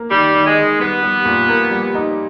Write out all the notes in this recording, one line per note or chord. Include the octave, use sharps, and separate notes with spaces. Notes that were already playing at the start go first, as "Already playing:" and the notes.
Already playing: A#3 A#4
D#3 G3
D#3
G#3
D#3
G3 B3
G3
A#2
A#3
G3
D#4